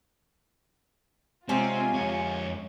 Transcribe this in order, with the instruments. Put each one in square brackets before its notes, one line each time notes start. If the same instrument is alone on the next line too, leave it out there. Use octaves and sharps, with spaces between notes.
[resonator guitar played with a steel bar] C3 C#4 [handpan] G#3 [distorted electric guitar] C4 [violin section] F4 G#5
[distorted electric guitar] F2 C#5